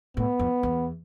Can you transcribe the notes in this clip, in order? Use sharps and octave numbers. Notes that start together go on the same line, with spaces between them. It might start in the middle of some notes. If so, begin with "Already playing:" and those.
A2 B3
F2
E2